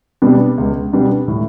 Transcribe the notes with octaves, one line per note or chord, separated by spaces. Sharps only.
B2 G3 B3 D4
C#2
B2 G3 B3 D4
A2